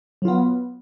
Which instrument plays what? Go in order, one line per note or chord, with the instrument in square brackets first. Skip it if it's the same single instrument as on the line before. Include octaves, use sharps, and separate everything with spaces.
[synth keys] F#3
F4
B3